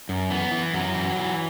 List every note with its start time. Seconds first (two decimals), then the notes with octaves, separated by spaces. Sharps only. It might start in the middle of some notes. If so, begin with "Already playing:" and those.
0.09 F#2
0.30 E3 B3
0.51 E3
0.74 F#2 F#3
0.94 E3
1.16 E3